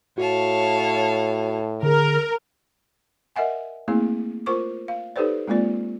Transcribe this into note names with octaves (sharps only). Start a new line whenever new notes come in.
A2 F#4 C#5 F5 A5
D3 G#4 A#4
A#4 D#5 E5 F#5 G#5
A3 A#3 C4 E4 G#4
F4 A#4 C5 C#6 D6
F5
D#4 G4 A4 B4 C5 D5
G#3 A#3 C4 F4 D5